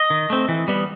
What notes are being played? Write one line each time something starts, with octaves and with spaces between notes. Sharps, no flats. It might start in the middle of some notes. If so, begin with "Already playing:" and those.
Already playing: D#5
D#3
A3 C4
E3
G3 B3